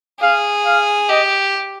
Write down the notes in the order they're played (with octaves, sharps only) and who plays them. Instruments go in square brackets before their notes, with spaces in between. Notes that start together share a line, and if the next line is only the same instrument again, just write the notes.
[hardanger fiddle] G#4 [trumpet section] F5
[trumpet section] F5
[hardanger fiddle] G4 [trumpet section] D#5